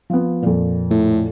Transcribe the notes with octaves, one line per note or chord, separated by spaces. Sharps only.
F3 B3
F2 A#2
A2